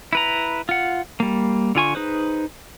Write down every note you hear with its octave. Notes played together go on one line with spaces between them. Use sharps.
E4 B4 A#5
F4 F#5
G3 A#3
D3 F4 G#5 C#6
D#4 G#4 B4 C5